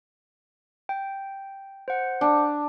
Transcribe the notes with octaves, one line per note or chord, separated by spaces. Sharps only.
G5
C5 F#5
D4